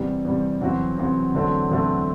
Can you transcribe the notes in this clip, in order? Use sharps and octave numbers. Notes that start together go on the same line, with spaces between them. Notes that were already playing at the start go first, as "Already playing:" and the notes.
Already playing: E2 C3 G3
E2 C3 G3
E2 C3 F#3 C4 F#4
E2 C3 F#3 C4 F#4
E2 D3 F#3 A3 C4
E2 D3 F#3 A3 C4